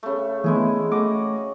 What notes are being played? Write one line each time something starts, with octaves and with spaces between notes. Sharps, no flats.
C#3 A3
E3 G#3 A3 B3 E4 G#4
A3 F#4 D#5 D6